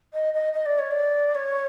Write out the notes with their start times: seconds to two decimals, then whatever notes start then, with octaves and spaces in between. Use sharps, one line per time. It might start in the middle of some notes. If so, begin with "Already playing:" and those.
0.14 D#5
0.34 D#5
0.53 D#5
0.66 D5
0.79 C#5
0.91 D5
1.35 C#5